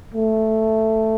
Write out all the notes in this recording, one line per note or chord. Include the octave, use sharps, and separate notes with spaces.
A3